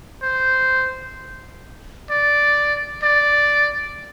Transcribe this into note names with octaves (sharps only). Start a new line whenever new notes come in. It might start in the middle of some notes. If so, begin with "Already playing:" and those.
C5
D5
D5